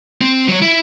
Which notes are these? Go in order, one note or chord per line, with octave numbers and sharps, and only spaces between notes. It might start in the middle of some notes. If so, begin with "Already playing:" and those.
C4
F#3 C#5
E4